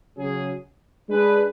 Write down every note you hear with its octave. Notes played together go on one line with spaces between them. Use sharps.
C#3 F#3 C#4 G#4
G#3 D4 G#4 B4